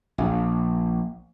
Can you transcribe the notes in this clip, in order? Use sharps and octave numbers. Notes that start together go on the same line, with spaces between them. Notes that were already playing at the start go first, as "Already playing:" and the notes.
A#1